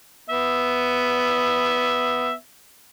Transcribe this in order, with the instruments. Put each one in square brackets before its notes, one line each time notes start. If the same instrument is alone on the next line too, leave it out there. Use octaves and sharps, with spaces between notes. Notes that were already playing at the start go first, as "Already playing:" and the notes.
[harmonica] B3 E5